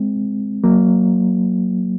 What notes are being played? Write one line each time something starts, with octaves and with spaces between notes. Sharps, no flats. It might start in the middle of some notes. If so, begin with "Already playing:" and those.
Already playing: G#3 C4
F#3 A#3